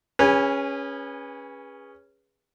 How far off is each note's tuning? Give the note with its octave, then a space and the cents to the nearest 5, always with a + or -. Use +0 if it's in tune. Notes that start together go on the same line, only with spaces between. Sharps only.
C#4 +0 G#4 -25 B4 -20